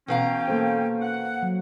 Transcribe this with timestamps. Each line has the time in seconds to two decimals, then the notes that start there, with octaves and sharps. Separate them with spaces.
0.08 B2 E3 C#4 F5 G5 A#5
0.48 A#3 A4 C5
1.01 F#5
1.43 F#3